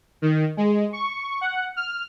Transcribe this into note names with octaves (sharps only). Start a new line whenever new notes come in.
D#3
G#3
C#6
F#5
F6